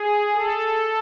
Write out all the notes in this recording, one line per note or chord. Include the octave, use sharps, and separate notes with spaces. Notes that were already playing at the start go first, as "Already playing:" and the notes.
Already playing: G#4
A4